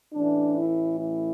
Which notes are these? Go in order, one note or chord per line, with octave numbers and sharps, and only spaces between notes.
A1 A2 E3 D4
E4
E4